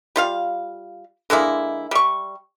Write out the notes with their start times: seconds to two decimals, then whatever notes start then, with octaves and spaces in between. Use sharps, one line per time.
0.16 G3 F4 F5
1.30 D3 G#3 A#3 E4
1.91 G3 C#6